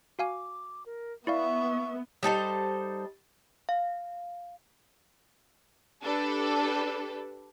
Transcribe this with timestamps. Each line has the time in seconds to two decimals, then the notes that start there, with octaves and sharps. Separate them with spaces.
0.19 F#4 F5 G#5 D6
0.86 A#4
1.27 B3 E4 D5 E5 F5 C#6
2.23 G3 D#4 A4 C5
3.69 F5
6.03 D4 G4 A4 B4